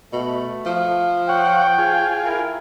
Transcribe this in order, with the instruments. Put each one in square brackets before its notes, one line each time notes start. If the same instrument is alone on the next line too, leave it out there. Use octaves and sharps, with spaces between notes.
[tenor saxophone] B2 [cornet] A3
[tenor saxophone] F3
[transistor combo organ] C#5 F#5 [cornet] G5
[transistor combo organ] F4 G#4
[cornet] E4 [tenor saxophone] A#4